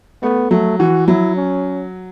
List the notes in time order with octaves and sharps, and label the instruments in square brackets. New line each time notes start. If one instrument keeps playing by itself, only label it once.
[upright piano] A3 [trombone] B3
[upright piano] F#3 [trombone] A3
[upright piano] E3 [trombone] F#4
[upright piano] F#3 [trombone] E4
[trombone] C#4